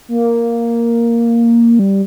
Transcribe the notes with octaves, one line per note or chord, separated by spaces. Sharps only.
A#3
G3